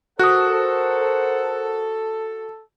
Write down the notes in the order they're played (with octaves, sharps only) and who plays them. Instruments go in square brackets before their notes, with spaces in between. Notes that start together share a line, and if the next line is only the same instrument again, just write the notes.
[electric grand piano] F#4 [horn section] A4 [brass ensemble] A#4 C5 F#5 [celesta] D#6 F#6